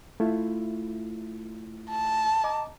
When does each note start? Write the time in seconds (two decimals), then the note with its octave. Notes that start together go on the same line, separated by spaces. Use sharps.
0.20 A3 E4 F4
1.90 A5
2.44 D#5 A#5 D6